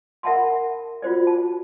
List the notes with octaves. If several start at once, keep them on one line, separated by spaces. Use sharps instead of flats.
A#4 E5 F#5 A5 B5 C6
F4 F#4 C5 D5
A5